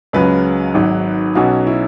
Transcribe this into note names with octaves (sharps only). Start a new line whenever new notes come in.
C#2 C#3 F#3 B4
G#1 G#2 F#3
B1 B2 F#3 C#4 F#4
E4